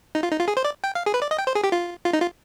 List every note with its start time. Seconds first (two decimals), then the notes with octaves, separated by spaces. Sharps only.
0.15 D#4
0.23 F4
0.32 D#4
0.40 F4
0.48 G#4
0.57 C5
0.64 D5
0.84 G5
0.95 F5
1.06 G#4
1.14 B4
1.22 D5
1.31 D#5
1.39 G5
1.47 C5
1.55 G#4
1.64 G4
1.72 F4
2.05 F4
2.13 D#4
2.21 F4